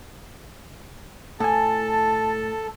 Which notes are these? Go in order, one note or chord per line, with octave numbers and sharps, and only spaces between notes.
A2 A4 G#5 A5